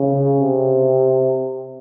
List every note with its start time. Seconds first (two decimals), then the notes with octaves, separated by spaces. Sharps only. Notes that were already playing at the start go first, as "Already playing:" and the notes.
Already playing: C#3
0.41 C3